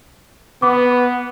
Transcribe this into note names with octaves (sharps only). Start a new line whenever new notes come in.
B3 D6